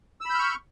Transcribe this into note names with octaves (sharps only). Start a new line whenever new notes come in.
B5 C#6 E6 F6 G6